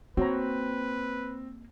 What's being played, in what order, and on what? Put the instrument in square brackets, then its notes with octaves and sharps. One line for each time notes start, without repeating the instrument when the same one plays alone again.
[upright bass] A#3 [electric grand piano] C4 [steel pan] F#4 C#5 A#5 [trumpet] B4